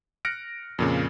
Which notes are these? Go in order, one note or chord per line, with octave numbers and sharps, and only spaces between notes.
F6 F#6 A#6 C#7 D7
F2 A#2 C#3